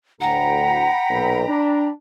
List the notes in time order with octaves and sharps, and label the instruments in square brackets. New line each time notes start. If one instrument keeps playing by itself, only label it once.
[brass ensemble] D2 A2 [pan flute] F#5 [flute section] G5 A#5 B5
[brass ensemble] B1 A#2
D4